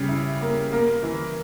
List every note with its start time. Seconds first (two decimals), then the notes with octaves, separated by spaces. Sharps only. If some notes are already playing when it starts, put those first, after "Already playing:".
Already playing: C#3 G3
0.09 E4
0.41 A#3
0.72 A#3
1.03 E3